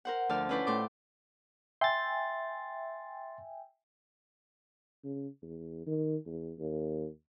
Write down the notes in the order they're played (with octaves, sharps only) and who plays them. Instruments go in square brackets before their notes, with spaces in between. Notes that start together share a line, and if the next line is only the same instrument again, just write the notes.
[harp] A#4 C5 F#5
D2 F3 D5 A5 F6
C#4 E4 F4 B4 C5 D5
A2 C6 D6
[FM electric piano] E5 G5 G#5 [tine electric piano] C6 A6
[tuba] C#3
E2
D#3
E2
D#2